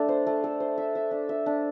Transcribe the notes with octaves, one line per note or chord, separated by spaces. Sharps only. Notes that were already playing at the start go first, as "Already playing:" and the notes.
Already playing: A3 D4
C5
A3
A4
C5
E5
E5
D4
E5
D4